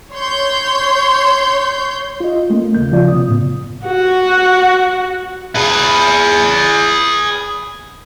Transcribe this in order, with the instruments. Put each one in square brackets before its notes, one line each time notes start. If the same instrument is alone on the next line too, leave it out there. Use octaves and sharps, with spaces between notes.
[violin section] C#5 C6 G6
[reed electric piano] F4 D#5
A3 A#3 C#4
D#2 C#3 A#3 G6
C#3 F3 F4 D5
C3 B3 D#6
F#2 A2 C#3
[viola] F#4
[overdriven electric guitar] G#4 B4